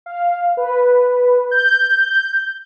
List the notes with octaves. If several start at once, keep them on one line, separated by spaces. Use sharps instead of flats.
F5
B4
G6